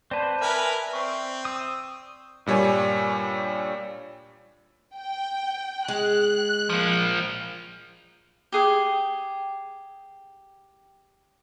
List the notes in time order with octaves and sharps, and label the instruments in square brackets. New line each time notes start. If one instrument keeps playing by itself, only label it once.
[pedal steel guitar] C4 B4 C5 [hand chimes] D5 A5
[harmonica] A#4 B4 G#5 [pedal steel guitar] E5 F6
[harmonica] C4 [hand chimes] D5 C#6
[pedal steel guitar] D#6 E6
[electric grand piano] G2 A#2 G3 C#5 G#5
[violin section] G5
[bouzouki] G#3 [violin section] F#6
[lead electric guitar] F3 A#3
[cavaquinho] G4 G#4 G5